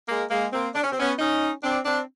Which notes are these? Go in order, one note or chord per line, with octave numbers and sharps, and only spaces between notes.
G#3 A#3
G#3 A#3
A#3 C4
D4
C#4
C4
B3 C#4
C#4 D#4
C4 D4
C4 D4